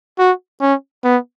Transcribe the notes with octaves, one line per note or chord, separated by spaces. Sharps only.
F#4
C#4
B3